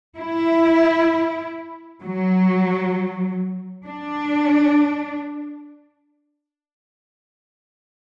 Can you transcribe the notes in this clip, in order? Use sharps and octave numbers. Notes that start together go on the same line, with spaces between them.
E4
F#3
D4